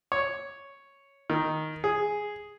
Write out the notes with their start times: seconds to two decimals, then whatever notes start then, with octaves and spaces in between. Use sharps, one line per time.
0.12 C#5
1.30 D#3
1.84 G#4